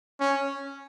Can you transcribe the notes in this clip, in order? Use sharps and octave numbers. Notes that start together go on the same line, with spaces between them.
C#4